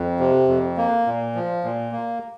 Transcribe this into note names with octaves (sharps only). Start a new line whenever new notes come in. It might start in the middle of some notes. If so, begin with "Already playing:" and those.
Already playing: F2
C3
F2
A#3
A#2
F3
A#2
A#3